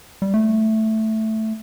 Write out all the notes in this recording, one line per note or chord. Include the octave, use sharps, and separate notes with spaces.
G3
A3